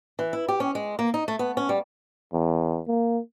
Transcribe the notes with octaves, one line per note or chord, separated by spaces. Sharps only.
E3
E4
G4
C#4
G#3
A#3
D#4
A3
B3
C#4
G3
E2
A#3